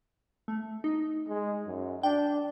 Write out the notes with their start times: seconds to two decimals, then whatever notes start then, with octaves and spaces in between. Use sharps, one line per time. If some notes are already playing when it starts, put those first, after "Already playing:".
0.48 A3
0.84 D#4
1.29 G#3
1.67 F#2
2.03 D4 G5